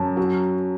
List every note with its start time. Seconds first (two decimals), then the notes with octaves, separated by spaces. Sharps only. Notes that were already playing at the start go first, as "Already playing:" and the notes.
Already playing: F#2 A5
0.17 F#3